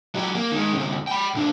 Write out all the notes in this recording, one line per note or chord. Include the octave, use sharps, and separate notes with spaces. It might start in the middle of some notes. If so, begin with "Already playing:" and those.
F#3 G4
A#3
D#3 G#3
D2 C3
G5 B5
B1 D4